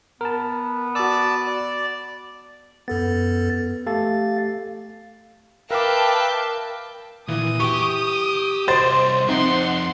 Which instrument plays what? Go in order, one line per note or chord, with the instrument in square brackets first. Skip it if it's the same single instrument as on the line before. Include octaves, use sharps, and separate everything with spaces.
[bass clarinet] B3 [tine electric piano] A#4 A5
[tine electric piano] F#4 E6 [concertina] D5 A5 D6
[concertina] D5
[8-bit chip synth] F#2 A4 A6 [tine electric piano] B3
[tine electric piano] A3 G4 A4 [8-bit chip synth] F5 A6
[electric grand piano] A#4 D6 [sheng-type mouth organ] B4 E5 F5 [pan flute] G5 [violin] A5 G6
[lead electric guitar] A#2 [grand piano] E3 [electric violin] D#6
[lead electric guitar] G4 G5 [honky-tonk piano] C#6
[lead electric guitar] C2 D#5 [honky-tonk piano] C5 [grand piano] A6 D7
[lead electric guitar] F2 E5 [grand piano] C4 D#4 [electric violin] F#5 C6